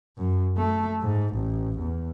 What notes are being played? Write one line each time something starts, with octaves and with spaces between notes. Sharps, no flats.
F#2
A3
G#2
A1
E2